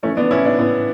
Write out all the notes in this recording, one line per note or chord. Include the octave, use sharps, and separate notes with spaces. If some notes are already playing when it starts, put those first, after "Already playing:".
E3 A3 C#4
B3 D4
A2 C#4 E4
B3 D4
A2 B3